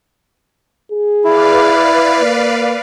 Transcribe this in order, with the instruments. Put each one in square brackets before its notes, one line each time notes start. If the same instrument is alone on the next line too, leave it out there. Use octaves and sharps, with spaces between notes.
[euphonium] G#4
[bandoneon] E4 [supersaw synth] B4 D5 F5
[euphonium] A#3